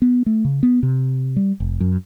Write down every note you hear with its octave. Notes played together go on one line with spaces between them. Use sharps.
B3
A3
C#3
B3
C3
G3
F1
F#2